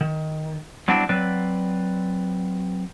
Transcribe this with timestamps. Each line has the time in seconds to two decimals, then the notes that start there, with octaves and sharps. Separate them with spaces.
0.01 D#3
0.88 F#3 G3 B3 C4 D4 E4
1.09 F#3 C4 B4 D5